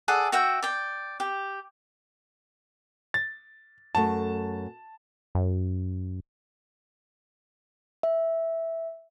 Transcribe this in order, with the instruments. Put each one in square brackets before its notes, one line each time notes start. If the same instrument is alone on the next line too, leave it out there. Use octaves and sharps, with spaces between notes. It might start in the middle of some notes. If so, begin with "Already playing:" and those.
[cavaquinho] G#4 A4 D5 F#5
F#4 E5 F#5 G5
D5 G5
G4
[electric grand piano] A6
[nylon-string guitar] F#2 A3 [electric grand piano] A5
[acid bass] F#2
[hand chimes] E5